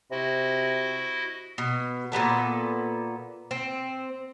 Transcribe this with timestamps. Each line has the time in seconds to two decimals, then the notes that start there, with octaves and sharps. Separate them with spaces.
0.11 C3 E4 F#4 D#5
1.58 B2
2.12 A#2 G3 B3 A4
3.51 C4